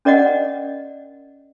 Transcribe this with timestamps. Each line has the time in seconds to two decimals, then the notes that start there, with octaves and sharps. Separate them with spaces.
0.05 C#4 A#4 D5 D#5 F#5